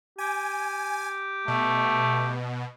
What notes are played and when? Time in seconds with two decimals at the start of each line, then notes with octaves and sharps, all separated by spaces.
0.18 G4 G#5
1.48 B2 A3